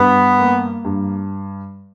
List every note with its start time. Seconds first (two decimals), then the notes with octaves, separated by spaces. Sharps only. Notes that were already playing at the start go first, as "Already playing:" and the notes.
Already playing: G2 B3
0.38 A#3
0.85 G2